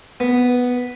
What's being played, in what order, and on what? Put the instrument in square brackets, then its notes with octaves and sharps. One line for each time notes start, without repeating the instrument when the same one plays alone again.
[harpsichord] B3